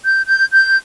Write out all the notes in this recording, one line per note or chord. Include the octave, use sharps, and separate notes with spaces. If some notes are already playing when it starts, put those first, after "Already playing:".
G6
G6
G6